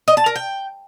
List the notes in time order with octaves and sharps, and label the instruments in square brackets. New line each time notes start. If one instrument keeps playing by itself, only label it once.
[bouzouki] D#5
A5
A#4
G5